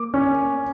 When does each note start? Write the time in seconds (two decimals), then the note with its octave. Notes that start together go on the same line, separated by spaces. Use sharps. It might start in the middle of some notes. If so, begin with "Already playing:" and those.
Already playing: A#3 D6
0.14 C#4